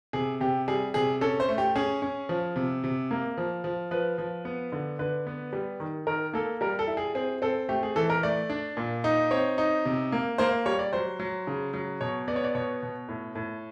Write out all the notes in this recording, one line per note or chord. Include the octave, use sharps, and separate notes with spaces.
C3 G#4
C3 G4
G3 G#4
C3 G#4
C#4 A4
C5
A3
G4
C#4 G#4
C#4
F3
C3
C3
A#3
F3
F3
F3 B4
F3
B3
D3
D3 B4
B3
G3
D#3
D#3 A#4
A#3 A4
G3 A#4
A4
E4
G#4
C4 G#4
C4 A4
A3 G4
G#4
E3 A4
A#4
A3 D5
D4
A#2
D#4
C4 C#5
D#4
C3
A#3
A#3 C5
G3 C#5
D5
F#3 C5
F#3
C#3
F#3
B2 C#5
B3 D5
C#5
D5
B2 C#5
B2
A2
A2